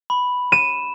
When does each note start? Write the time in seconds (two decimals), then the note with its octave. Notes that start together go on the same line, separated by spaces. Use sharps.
0.10 B5
0.52 D#7 E7